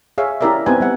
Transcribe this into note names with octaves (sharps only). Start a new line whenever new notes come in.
G#4 C#5 E5 F5
C#4 E4 G4 A#4 D5 E5
B3 C4 D#4 G4 B4 G#5
G3 E5 F#5